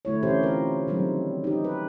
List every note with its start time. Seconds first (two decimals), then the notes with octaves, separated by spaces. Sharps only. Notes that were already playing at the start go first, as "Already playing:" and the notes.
0.05 D3 A3 E4 C#5
0.22 C3 E3 C#4 G4 C5
0.43 F4 A#4
0.88 D#3 F#3 G3 C4
1.44 D#4 G4
1.64 B4